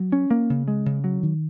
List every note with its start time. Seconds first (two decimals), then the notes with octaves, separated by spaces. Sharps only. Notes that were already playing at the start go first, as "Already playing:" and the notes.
Already playing: F#3
0.12 C#4
0.31 A#3
0.50 C#3
0.68 G#3
0.86 C#3
1.04 F#3
1.23 D#3